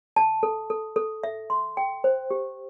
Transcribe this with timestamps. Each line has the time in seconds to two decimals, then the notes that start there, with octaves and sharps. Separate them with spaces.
0.16 A5
0.43 A4
0.70 A4
0.96 A4
1.24 E5
1.50 C6
1.77 G5
2.04 C5
2.31 G4